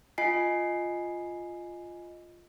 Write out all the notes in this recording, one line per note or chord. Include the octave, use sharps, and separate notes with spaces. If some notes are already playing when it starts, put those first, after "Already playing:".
F4 D#5 G#5 C7